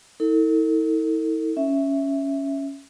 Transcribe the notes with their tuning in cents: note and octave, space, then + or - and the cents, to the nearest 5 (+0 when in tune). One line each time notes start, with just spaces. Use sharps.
E4 -40 A4 +40
C#4 +0 E5 +0